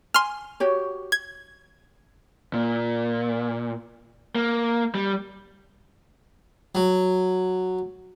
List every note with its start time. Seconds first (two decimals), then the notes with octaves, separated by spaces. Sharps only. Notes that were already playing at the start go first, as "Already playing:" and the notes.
0.14 G#5 C6 F6
0.60 F#4 G4 C#5
1.12 G#6
2.53 A#2
4.35 A#3
4.95 G3
6.75 F#3